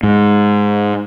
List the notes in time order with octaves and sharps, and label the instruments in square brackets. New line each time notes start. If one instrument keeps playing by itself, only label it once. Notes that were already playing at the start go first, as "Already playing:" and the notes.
[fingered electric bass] G#2